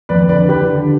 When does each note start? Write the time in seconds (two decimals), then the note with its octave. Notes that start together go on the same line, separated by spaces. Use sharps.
0.09 F2 B4 D5
0.29 D3 B4 D5
0.49 D3 G4 B4
0.69 D3